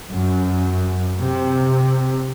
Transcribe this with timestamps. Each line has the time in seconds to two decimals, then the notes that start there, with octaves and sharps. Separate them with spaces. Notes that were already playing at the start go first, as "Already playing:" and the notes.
0.11 F#2
1.19 C3